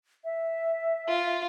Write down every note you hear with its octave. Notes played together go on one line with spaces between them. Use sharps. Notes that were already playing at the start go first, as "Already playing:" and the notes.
E5
F4